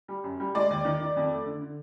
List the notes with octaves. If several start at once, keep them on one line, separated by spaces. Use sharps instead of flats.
G3
F#2
G3
G#3 D5
D#2
D#3
D#3
F2
A3
D3
D3